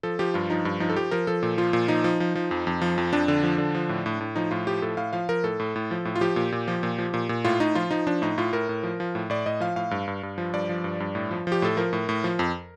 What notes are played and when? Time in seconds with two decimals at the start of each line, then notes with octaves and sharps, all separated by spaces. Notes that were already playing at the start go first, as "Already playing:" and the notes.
0.03 F3 A4
0.19 F3 G4
0.34 G2 F4
0.50 F3 D#4
0.65 G2
0.80 F3 D#4
0.90 A4
0.96 F3 G4
1.11 F3 A#4
1.27 F3 A4
1.43 A#2
1.58 F3 F4
1.73 A#2
1.88 F3 D#4
2.04 F3
2.20 F3
2.35 F3
2.51 F2
2.67 F2
2.81 F3
2.98 F2
3.13 F2 D4
3.28 D3
3.43 F3
3.58 D3
3.75 F3
3.89 A2
4.06 A2
4.21 A2
4.36 F3 D#4
4.51 A2 F4
4.67 F3 G4
4.82 A2 A4
4.97 A2 F5
5.13 F3 F5
5.29 F3 A#4
5.43 A2 A4
5.60 A2
5.76 A2
5.91 F3
6.05 A2
6.16 F4
6.21 F3 G4
6.36 A#2
6.52 A#2
6.68 F3
6.83 A#2
6.98 F3
7.14 A#2
7.29 A#2
7.45 A2 F4
7.60 A2 D#4
7.75 F3 F4
7.91 F3 D#4
8.07 F3 D4
8.22 A2 D#4
8.38 A2 F4
8.53 A2 A#4
8.69 A2
8.83 F3
9.00 F3
9.15 A2
9.30 A2 D5
9.46 A2 D#5
9.60 F3 F5
9.76 A2 F5
9.91 G2
10.08 G2
10.23 G2
10.38 F3
10.53 G2 D5
10.69 F3
10.84 G2
11.00 G2
11.15 A2
11.31 F3
11.47 F3 G4
11.62 A2 A4
11.77 F3 A#4
11.93 A2
12.09 A2
12.24 F3
12.39 F2